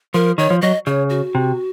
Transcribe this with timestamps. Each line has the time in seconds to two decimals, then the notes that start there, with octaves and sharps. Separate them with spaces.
0.14 F3 A#4
0.38 D#3 C#5
0.50 F3
0.62 F#3 D#5
0.86 C#3 C#5
1.10 F#4
1.35 C3